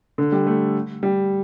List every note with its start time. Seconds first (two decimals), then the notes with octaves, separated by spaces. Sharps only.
0.18 D3
0.32 G3
0.47 A3
1.03 G3